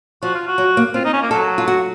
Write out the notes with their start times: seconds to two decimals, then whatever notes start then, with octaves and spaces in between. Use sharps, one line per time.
0.22 F3 F#4
0.34 F4
0.47 F#4
0.58 F#3
0.77 A#3
0.94 C4 F4
1.04 D#4
1.13 C#4
1.22 A#3
1.31 F#3 A4
1.58 F4
1.68 F#4